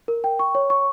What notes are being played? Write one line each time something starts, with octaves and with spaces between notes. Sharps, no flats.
A#4
G5
C#6
C#5
C#6